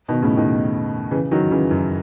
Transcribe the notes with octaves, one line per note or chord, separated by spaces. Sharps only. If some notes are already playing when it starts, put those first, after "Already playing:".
B2 D#3
A2 C#3
B2 D#3
C#3 E3
D#3 F#3
C#3 E3
F#2